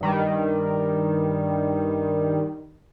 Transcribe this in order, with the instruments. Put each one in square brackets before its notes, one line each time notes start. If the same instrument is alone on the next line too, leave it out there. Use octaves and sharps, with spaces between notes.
[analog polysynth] G2 D#3 G3